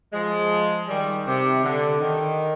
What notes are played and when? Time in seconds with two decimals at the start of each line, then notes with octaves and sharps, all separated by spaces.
0.13 F3 G#3
0.89 D#3 G3
1.27 C3
1.64 D3
2.00 D#3